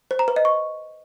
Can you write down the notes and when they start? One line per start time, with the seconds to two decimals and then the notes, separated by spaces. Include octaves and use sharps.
0.11 C5
0.19 A#5
0.28 B4
0.36 D#5
0.45 C#6